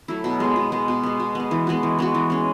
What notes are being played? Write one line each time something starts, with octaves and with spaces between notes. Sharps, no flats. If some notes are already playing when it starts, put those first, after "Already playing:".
F#3 A3 E4
B2
G#3 B3
B2
G#3 B3
B2
G#3 B3
B2
G#3 B3
E3
G#3 B3 F#4
E3
G#3 B3 F#4
E3
G#3 C#4